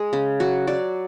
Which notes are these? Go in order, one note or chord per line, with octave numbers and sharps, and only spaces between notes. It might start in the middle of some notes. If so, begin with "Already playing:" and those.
Already playing: G#3 G#4
C#3
F#3 F#4
F#3 D5